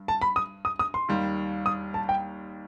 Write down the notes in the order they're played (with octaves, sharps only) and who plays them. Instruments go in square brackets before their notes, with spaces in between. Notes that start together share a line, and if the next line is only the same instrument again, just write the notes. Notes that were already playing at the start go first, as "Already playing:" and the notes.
Already playing: [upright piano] G2
[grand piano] A5
B5
D#6
D#6
D#6
C6
[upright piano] D#2 D#3 G3
[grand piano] D#6
A5
G5